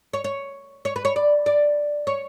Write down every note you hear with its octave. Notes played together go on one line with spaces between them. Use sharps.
C#5
C#5
C#5
B4
C#5
D5
D5
C#5